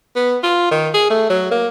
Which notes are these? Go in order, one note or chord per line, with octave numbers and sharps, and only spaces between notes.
B3
F4
D#3
G#4
A3
F#3
A#3